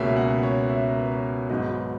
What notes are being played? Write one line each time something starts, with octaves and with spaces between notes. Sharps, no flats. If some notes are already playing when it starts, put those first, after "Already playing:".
Already playing: C#2 B2 A#3 C#4 E5
F#5
B4
C#5
E5
A#4
B4
C#5
G#1 G#2 F#3 B3 D#5